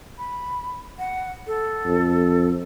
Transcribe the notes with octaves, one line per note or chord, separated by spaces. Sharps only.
B5
F#5
A4
F2